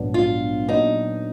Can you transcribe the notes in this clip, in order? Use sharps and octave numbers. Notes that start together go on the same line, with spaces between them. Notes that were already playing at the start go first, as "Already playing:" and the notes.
Already playing: A#1 G#2 F#3 B3 D4
F4
A#2 F#3 B3 D4 D#4